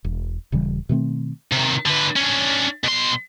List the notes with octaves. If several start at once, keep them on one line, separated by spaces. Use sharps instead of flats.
E1
D#1 C#3 E3 G3
B2 D#3 A3 C4
C3 D#3
D3 B4
C#4 D4
B2 C6